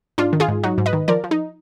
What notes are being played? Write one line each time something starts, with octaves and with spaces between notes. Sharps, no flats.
G#2 D4 F4
D#3
F4 G#4
G#2
F#3 D#4 F#4
G#2
B4 D#5
D#3
F3 A#4 D5
F3
D#4